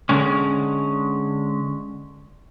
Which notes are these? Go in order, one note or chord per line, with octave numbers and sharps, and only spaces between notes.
D3 G#3 C#4